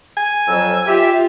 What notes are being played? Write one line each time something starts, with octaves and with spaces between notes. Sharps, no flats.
G#5
F2 F#3 E6
F4 G4 E5